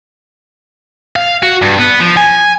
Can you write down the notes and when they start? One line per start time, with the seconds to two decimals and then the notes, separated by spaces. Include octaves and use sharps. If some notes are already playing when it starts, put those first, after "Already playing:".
1.16 F5
1.43 F#4
1.62 G2
1.79 B3
2.01 F3
2.17 G#5